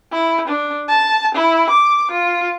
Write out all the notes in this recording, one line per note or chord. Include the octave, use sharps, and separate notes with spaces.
E4
D4
A5
E4
D6
F4